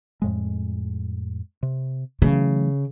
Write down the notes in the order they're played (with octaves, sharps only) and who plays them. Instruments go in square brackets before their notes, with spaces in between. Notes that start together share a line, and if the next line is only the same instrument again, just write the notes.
[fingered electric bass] F2 A2 G#3
C3
[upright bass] C#3 [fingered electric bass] E3 F#3 A3